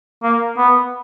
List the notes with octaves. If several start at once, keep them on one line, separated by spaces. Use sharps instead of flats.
A#3
B3